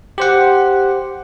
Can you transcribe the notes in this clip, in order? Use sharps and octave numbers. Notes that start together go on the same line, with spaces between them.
G4 C5 F#5